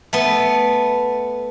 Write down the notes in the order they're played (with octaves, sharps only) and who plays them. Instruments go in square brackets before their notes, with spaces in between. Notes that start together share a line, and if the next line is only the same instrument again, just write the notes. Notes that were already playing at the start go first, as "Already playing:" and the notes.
[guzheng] A3 B3